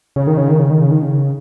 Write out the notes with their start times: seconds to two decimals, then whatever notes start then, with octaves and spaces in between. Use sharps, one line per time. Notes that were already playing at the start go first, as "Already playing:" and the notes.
0.16 C#3
0.27 D#3
0.37 C#3
0.49 D#3
0.59 C#3
0.71 D#3
0.81 C#3
0.92 D#3
1.02 C#3